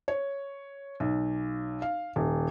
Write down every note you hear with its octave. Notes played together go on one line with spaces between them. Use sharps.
C#5
B1
F5
D#1